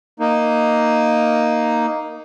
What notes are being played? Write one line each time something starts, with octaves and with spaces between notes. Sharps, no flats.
A#3 D#4